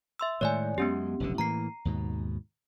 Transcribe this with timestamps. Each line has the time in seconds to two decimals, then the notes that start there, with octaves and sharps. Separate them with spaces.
0.19 E5 C6 E6
0.41 A2 D#3 G#3 C#5 D5 G#5
0.78 F#2 G#3 B3 C#4 G4
1.20 F1 B1 D3
1.38 A2 E3 A#3 A#5 C7
1.85 D#2 G#2 B2